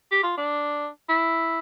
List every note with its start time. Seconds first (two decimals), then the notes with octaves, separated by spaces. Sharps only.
0.11 G4
0.23 F4
0.37 D4
1.09 E4